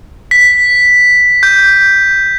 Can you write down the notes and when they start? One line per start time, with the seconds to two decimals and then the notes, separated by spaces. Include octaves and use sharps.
0.31 B6
1.43 G6